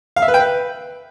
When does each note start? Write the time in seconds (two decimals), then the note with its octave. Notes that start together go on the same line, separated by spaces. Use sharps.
0.16 F5
0.22 E5
0.28 B4
0.34 G5
0.40 B4